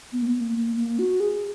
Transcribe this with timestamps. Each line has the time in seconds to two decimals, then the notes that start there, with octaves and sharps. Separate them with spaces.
0.12 B3
0.22 A#3
0.26 B3
0.40 A#3
0.56 A#3
0.76 A#3
0.99 F#4
1.20 G#4